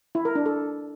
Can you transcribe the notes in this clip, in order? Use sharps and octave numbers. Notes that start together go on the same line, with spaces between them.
E4
A#4
D4
A4